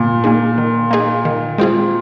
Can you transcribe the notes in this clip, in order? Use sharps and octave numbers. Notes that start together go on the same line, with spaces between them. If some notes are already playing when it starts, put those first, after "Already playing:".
Already playing: A#2
A#3 D#4 G#4
D#3
A#3 D#4 G#4
D#3
G#3 C4 F4 G#4